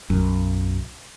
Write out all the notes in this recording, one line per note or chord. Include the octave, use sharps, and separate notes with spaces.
B1 F#2